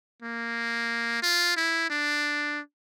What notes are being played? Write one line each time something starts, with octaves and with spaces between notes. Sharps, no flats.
A#3
F4
E4
D4